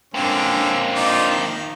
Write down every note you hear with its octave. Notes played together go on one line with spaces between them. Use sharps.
D3 A#3 C4 C#4
D#4 F4 D5
D#3